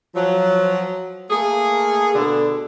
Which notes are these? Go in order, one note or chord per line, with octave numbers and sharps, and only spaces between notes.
F3 F#3
A3 A#3 G#4
B2 D3